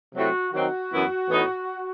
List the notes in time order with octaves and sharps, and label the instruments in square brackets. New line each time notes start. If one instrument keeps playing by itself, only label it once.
[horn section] C3 F#3 A3 C4 E4 F#4
D#3 F#3 C4 D#4 F#4
F#2 E3 B3 E4
A2 E3 B3 D#4